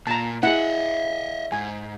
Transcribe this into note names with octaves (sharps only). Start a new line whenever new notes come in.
A#2 A5 A#5
E4 G#4 D#5 E5 F#5
G#2 G#5